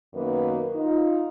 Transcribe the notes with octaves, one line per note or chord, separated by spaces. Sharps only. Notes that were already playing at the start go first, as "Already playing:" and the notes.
F#2 D#3 A#3 B3 F#4 B4
D#4 F4